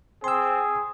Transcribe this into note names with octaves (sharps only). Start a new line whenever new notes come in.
C4 G#4 C6 E6